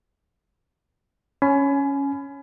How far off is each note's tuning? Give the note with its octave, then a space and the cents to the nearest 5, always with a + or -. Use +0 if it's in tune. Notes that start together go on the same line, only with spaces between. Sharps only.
C#4 +0 G#5 +25 B5 +25